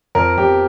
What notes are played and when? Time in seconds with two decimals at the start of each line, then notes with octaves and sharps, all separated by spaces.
0.15 F2 A#4
0.37 F2 G4